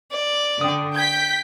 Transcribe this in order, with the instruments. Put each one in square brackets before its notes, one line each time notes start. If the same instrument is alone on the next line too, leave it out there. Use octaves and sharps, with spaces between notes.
[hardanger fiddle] D5
[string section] D3 [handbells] G5 D#6
[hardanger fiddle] G5 [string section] G6 B6 [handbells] G#6